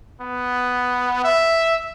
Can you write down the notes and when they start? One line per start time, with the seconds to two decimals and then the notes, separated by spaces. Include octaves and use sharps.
0.21 B3
1.24 E5